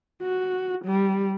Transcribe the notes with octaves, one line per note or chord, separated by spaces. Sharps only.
F#4
G3